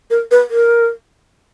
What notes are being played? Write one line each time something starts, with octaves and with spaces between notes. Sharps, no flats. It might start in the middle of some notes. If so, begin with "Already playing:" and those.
A#4
B4
A#4